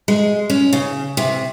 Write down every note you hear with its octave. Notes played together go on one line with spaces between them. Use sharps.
G#3
C#4
C#3
C3